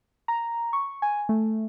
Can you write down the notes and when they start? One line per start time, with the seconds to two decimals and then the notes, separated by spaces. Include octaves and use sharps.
0.28 A#5
0.73 C#6
1.02 G#5
1.29 A3